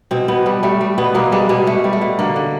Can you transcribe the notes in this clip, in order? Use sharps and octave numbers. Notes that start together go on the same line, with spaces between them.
B2 C4
B2 B3
G3
G3 A3
G3
B2 B3
B2 A#3
G3 G#3
B2 G#3
B2 A3
G3
A3
B2
D3 A#3
D3